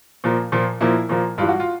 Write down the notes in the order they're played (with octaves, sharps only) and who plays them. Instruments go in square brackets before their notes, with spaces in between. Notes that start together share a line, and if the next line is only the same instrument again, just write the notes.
[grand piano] A#2 F3 A#3
A#2 F3 A#3
A#2 F3 A#3 E4
A#2 F3 A#3
G2 E3 G3 F4
F#4
F4